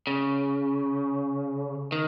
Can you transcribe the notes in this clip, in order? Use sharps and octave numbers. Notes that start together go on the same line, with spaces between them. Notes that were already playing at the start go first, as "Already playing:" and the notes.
C#3
D#3